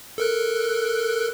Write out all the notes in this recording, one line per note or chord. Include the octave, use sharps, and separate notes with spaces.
A4 A#4 F#6